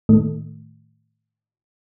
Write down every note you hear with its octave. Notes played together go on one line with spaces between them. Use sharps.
A2 D#3 A3